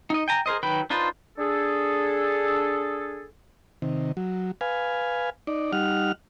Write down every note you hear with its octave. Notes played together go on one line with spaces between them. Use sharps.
D#4 D#5
G5 G#5 A#5
G#4 A#4 C5 D#5
D#3 F#3 B4 G5 B5
D4 D#4 F4 B4 C5
D4 G#4 A4
C3 D#3
F#3
B4 F5 G#5
D#4 D5
G3 D#4 F#5 F6